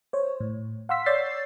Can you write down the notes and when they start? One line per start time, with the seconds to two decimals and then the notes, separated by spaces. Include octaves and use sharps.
0.13 C5 C#5
0.41 A2
0.89 F5 F#5 C6 E6 B6
1.06 C#5 D5 E6 G6 A6 C7